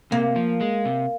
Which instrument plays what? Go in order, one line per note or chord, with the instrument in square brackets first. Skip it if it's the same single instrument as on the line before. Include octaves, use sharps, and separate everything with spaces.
[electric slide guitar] C3 [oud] A#3
[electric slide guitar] F3
G#3
C3